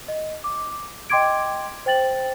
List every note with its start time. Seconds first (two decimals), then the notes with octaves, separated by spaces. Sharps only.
0.08 D#5
0.44 D6
1.10 D#5 G5 C6 D6 G#6 D7
1.86 C5 G5 A6 F#7